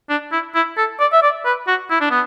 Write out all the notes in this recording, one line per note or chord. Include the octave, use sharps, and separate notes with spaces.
D4
E4
E4
A4
D5
E5
D5
B4
F#4
E4
D4
B3